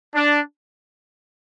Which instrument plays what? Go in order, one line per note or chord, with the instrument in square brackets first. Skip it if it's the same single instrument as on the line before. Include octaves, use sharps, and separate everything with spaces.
[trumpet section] D4